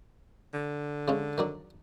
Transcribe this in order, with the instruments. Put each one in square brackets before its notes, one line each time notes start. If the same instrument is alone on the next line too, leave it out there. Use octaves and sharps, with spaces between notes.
[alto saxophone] D3
[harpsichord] C#3 G#3 C#4
D#3 F#3 D4